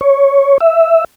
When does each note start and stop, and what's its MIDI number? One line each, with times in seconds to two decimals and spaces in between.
0.01 0.58 73
0.61 1.05 76